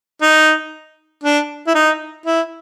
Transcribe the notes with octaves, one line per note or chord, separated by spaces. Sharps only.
D#4
D4
E4
D#4
E4